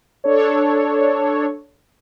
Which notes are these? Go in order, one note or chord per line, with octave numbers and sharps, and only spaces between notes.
D4 A4 C#5